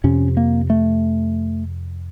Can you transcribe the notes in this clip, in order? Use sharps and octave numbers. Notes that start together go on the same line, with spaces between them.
F2 C3 C#4
A#3
A3